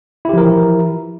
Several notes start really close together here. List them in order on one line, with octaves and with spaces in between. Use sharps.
E4 G4 F3 A#4 E3